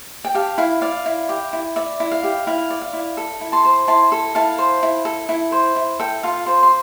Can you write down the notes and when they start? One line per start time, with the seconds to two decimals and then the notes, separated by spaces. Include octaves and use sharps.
0.25 G5
0.35 G4 F5 A5
0.58 E4 F5
0.82 D5 F5
1.06 E4
1.29 G4
1.53 E4
1.76 D5 E5
2.00 E4
2.12 F5
2.23 G4
2.47 E4 F5
2.71 D5
2.81 F5
2.93 E4
3.17 A4
3.41 E4
3.52 A5 C6
3.64 C5
3.88 E4 A5 C6
4.12 A4
4.35 E4 F5 A5
4.58 C5
4.83 E4
5.05 A4
5.29 E4
5.52 C5
5.76 E4
5.99 A4 E5 G5
6.23 F4 F5 A5
6.46 C5
6.63 C6